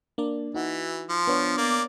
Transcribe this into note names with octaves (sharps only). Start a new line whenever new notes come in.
A#3 D4 D5
E3 D#4 E4 F#4
F3
B3 D4 C#5
A#3 D5